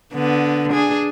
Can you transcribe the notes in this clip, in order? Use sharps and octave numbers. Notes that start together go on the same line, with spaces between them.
D3 B3
D4 G#4